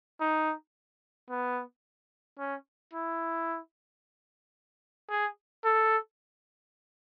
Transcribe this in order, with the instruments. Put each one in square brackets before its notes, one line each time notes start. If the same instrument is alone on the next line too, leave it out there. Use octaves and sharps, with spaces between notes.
[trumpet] D#4
B3
C#4
E4
G#4
A4